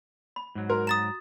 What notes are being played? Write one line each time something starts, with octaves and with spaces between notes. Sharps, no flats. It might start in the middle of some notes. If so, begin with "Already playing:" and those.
B5
G#2 F#3
F#4 A#4
A#5 D#6 A6 E7